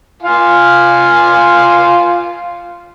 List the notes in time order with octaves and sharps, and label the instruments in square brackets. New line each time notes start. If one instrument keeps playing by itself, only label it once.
[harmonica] F4 F5 G#5